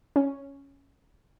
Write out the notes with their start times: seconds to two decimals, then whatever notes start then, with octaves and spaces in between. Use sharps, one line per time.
0.16 C#4